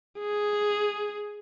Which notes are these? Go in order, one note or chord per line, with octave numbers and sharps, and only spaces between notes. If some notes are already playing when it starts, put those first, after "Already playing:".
G#4